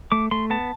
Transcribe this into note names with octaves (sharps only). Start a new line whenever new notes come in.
A3 D6
A3 C6
B3 A5